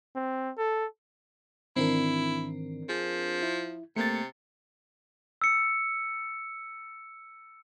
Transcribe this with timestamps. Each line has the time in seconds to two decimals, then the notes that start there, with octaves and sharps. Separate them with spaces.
0.16 C4
0.58 A4
1.76 G#2 D#3 E3 C4 D4 E4 A#4
2.89 F3 G#4
3.43 E4
3.96 C3 A3 A#3 A6 C#7
5.42 E6 C#7